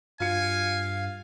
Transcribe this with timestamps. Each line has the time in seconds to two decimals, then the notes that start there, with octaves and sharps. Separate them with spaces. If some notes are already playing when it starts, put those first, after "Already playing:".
0.20 G2 F4 F5 G#5 C#7